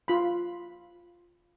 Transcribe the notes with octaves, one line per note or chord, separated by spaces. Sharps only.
F4 B5